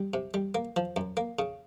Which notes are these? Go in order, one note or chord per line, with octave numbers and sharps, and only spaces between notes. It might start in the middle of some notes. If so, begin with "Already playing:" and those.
Already playing: G3
C3
G3
A#3
F3
F#2
A#3
C#3